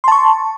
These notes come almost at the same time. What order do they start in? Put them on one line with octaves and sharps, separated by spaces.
C6 A5 C#6